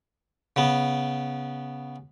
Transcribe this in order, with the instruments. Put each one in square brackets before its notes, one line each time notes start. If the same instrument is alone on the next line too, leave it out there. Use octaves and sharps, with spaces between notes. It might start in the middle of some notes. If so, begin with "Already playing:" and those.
[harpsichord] C#3 B3